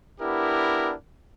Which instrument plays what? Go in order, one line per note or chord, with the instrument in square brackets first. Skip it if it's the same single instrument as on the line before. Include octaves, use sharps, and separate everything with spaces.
[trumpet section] B3 D4 E4 G4 A#4